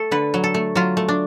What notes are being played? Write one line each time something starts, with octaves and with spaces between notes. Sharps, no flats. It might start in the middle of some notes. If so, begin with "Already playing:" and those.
Already playing: A3 A4
D3 B4
F#3
A4
A3
F#3 F4
A3
D4